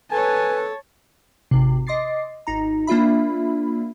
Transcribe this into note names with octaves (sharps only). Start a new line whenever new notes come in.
A4 B4 C#5 G#5 A5
G#1 C3
D#5 C6 D6 A6 C7
G#1 D#4 A#5
A#3 D4 F4 E5 B5